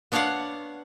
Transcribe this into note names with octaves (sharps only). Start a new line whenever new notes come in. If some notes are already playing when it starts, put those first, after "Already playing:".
B3 D4 C#5 D5 F5 F#5